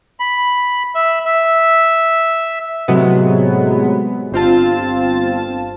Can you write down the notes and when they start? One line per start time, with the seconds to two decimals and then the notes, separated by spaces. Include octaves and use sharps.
0.20 B5
0.95 E5
1.26 E5
2.88 A2 C3 F#3 G#3 B3
4.32 G1 C4 F4 A5